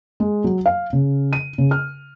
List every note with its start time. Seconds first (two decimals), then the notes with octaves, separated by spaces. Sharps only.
0.20 G#3
0.44 F#3
0.66 F5
0.93 C#3
1.33 D#7
1.58 C#3
1.71 F6